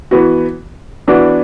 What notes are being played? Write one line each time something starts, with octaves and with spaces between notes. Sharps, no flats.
E3 B3 F#4
E3 B3 D4 F#4